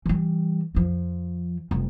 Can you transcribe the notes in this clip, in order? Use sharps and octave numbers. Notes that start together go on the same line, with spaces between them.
E3 G3
F2 F3
F1 G3